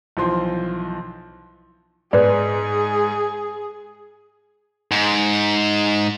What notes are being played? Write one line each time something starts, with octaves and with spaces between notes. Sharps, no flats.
B1 E3 F3 C5 C6
G#2 G#4 B4 D5
G#2